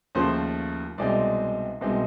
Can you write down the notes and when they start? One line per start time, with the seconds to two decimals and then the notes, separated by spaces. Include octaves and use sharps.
0.15 D#2 C#3 F3 A3 C5
0.98 C2 B2 G#3 C4 D#4 D5
1.81 C2 B2 G#3 C4 D#4